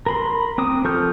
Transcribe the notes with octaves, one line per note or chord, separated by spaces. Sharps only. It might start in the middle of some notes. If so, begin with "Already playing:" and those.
A#4 B5 C6
C4 D6 D#6
F3 A4 C#6 F6 G6